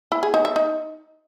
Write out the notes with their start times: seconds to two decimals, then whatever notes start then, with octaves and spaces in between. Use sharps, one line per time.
0.12 E4
0.23 G#4
0.34 D#4
0.45 E5
0.56 D#4